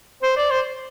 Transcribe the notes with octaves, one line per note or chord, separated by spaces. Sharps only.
C5
D5
C5